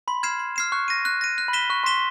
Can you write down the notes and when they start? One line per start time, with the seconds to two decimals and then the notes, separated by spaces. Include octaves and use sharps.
0.08 B5 C6
0.23 F6 G#6 C7 E7
0.39 C6
0.56 F6 G#6 C7 E7
0.72 C#6 F#6
0.88 A#6 D#7
1.05 F#6
1.21 A#6 D#7
1.38 F#6
1.48 B5
1.53 B6 E7 G7
1.70 C#6 F#6
1.84 C6 B6 E7 G7